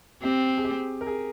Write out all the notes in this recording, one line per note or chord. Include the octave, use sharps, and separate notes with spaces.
C4 G4
G#4
G4
A#4
G#4